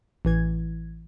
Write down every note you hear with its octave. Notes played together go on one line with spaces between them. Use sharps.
A1 E3 G#6